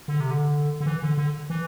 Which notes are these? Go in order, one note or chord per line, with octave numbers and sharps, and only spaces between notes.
D3
C3
D3
D3
E3
D3
D3
E3